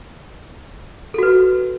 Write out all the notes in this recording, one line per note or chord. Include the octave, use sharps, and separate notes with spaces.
F#4 A4 B4